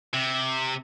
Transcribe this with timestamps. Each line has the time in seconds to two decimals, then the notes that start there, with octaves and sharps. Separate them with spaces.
0.14 C3